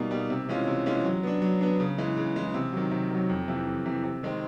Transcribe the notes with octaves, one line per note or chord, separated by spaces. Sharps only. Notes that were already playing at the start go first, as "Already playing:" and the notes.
Already playing: B2 G3 A#3 D#4
G3 A#3 D#4
C3
E3 G#3 C#4 F4
C3
E3 G#3 C#4 F4
F#3
B3 D4
F#3
B3 D4
C#3
E3 G#3
C#3
E3 G#3
C3
D#3 F#3
C3
D#3 F#3
F2
C3 E3
F2
C3 E3
C3
D#3 G#3 C4